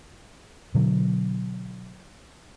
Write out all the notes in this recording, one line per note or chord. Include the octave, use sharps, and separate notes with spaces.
B2 D3 F#3